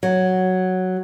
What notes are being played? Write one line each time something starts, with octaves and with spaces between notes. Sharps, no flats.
F#3